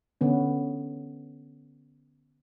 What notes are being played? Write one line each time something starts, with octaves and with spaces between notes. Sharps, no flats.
D3 B3 C#4